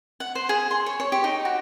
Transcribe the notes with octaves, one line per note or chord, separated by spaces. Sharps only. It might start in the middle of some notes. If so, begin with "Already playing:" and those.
F#5
C5
G#4
C6
C#5
C#5
G4
D#4
F#4